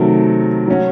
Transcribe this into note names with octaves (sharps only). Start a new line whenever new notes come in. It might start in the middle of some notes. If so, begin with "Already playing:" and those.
Already playing: C3 D#3 F#3 A3
F#3 C#4 F#4